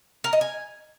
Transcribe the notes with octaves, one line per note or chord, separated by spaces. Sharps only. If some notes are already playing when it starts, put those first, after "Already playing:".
A#4
D#5
G#5